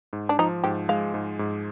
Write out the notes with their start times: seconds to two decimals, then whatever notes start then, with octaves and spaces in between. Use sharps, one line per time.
0.13 G#2
0.29 D4
0.39 F3 D#4
0.64 G#2 G4
0.89 G#3 F5
1.14 G#2
1.39 G#2